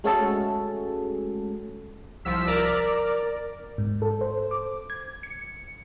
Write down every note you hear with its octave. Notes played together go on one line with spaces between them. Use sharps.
G#3 A3 C#4 F#4 G#4 A4
C2 F3 E6 B6
A#4 D5
G#2
A4
C5
D6
G#6
C#7